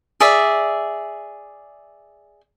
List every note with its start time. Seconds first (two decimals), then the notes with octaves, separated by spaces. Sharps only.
0.20 G#4 D5 E5